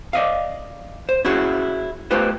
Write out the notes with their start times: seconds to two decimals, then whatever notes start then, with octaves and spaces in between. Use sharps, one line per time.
0.13 D5 D#5 F5
1.09 C5
1.25 C#4 E4 F#4 G#4
2.11 A3 F4 G4 B4 C5